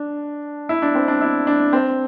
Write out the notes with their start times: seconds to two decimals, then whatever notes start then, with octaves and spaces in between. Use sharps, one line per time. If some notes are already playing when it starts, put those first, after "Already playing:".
Already playing: D4
0.69 E4
0.82 D4
0.95 C4
1.08 D4
1.21 E4
1.47 D4
1.73 C4